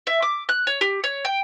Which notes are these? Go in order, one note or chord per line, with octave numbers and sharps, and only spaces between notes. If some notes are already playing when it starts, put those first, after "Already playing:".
E5
D6
F#6
C#5
G4
C#5
G5